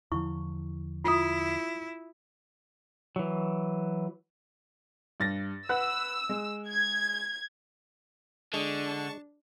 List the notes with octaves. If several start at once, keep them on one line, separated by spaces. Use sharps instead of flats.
E2 D3 F3 E4 C#6
E4 F4 D#6
E3 F#3
G2 A6 A#6
B4 F#5 E6 F#6
G#3
G#6
D3 G#3 D4 A5 C#6